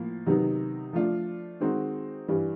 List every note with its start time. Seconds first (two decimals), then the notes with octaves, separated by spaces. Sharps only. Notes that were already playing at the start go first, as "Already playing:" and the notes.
Already playing: A2 F3 A#3
0.26 C3 D#3 F#3 B3 D#4
0.93 F3 A3 D4 F4
1.60 D#3 G#3 C4 D#4 F#4
2.28 G2 E3 G3